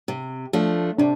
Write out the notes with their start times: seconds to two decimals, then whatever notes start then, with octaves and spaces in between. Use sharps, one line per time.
0.08 C3
0.53 F3 A3 D4
0.98 C3 D4